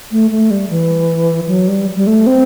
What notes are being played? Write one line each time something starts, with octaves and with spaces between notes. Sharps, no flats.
A3
A3
G3
E3
F#3
G3
G3
A3
C4